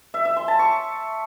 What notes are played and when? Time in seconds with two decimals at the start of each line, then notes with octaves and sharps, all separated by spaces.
0.14 E5
0.25 E5
0.37 C6
0.48 A5
0.59 C#6